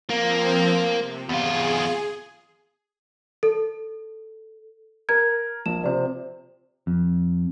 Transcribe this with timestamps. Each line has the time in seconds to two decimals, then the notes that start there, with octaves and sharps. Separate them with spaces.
0.10 F3 A#3 C4
0.98 C3
1.29 E2 F4 G#4
3.43 A4
5.09 A#4 G#6
5.66 A#1 E7
5.84 C3 F3 C4 C5 D5
6.87 F2